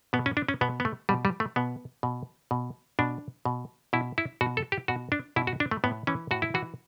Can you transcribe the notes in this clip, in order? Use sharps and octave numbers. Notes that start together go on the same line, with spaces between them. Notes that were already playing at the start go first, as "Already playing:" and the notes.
B2 B3
C#4
D4
C#4
B2 B3
B3
A3
B2 G3
G3
A3
B2 B3
B2
B2
B2 D4
B2
B2 E4
E4
B2 F#4
A4
G4
B2 F#4
D4
B2 E4
F#4
D4
A3
A2 B3
E3 C#4
A2 F#4
E4
E3 F#4